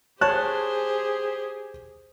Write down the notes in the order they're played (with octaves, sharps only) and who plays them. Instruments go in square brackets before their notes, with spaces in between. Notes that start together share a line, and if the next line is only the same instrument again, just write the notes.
[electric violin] G4 G#4 [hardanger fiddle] C5 [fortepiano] C#5 F#6 [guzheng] A5